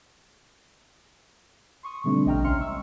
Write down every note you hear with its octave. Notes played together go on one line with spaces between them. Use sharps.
C6 C#6 D#6
B2 D3 G3 A3 C4 D4
A#1 D#5 G5 A#5 F6
C#2 C#4 E5 C6 F6 C#7
C#6 E6